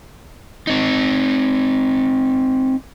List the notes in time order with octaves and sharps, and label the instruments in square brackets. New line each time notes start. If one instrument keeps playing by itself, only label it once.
[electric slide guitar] C4 D#4